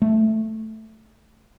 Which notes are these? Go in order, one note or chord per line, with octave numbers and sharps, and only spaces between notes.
A3